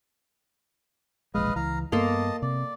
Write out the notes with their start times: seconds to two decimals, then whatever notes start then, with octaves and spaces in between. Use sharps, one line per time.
1.35 E1 A#1 G#3 B4 D#5 F5
1.56 C#2 E3 F5 A#5
1.92 G2 A#3 B3 A4 D#5 A5 C6
2.42 C3 D5